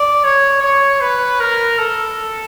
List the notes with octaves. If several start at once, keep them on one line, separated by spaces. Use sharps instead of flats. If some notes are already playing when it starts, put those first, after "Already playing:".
Already playing: D5
C#5
C#5
B4
A#4
A4